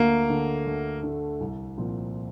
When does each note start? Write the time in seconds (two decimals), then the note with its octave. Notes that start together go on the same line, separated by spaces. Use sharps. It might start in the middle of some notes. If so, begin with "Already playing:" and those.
Already playing: D2 A#3
0.29 D3 A3
0.66 D2
1.03 D3 A3
1.40 C2
1.78 A#2 F3 C4